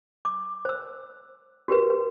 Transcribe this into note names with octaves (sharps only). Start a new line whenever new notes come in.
D6
C5 E6
F#4 G4 A#4 B4
B4